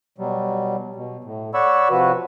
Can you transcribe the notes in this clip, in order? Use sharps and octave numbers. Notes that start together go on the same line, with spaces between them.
B2 F#3 G3
B2
A2
C#5 D5 F#5 B5 C#6 E6
C3 F3 F#4 B4